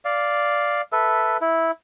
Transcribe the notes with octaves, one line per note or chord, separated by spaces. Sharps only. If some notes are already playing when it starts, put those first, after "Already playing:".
D5 F5
A4 B4 E5
E4